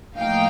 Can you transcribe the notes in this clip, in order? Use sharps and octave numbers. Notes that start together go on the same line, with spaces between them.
A2 F3 A#3 D#4 F5 G5